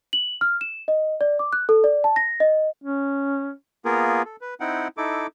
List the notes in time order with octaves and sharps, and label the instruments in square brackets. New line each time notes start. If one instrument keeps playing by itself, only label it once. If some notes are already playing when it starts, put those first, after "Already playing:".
[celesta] F#7
F6
E7
D#5
D5
D6
F#6
A4
D5
A5
A#6
D#5
[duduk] C#4
[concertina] A#3 B3 F4 G#4 A#4
A4
B4
C4 D#4 E4 F#5 G5
D#4 E4 A4 D6